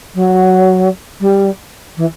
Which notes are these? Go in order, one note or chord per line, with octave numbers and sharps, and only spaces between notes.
F#3
G3
E3